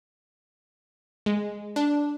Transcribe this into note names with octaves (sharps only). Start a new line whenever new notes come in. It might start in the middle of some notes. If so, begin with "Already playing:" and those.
G#3
D4